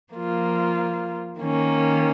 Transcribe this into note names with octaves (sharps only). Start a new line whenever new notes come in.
F3 A#3 F4
D#3 A#3 C#4